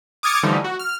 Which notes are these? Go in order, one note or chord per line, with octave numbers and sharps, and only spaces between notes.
D6 D#6 F6 G#6 A6 C#7
D3 E3 F3 G3 A3 D#4
F#4
F6